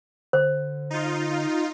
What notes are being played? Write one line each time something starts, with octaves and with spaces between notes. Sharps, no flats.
D3 C5
D#4 F4